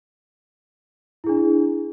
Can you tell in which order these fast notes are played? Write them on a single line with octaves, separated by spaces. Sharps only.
E4 G#4 D4